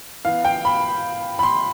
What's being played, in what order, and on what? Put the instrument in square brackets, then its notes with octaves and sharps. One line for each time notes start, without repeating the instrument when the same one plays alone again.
[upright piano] E3 B3 F5
G5
B5
B5
C6